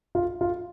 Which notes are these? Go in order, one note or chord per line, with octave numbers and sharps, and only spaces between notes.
F4
F4